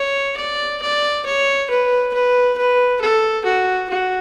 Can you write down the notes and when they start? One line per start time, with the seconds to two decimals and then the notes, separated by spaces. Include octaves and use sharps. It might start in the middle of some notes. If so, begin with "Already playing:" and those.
Already playing: C#5
0.36 D5
0.82 D5
1.26 C#5
1.70 B4
2.13 B4
2.57 B4
3.01 A4
3.45 F#4
3.90 F#4